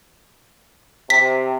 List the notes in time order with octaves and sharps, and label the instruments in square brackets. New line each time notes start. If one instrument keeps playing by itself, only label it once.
[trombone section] C3 [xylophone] B6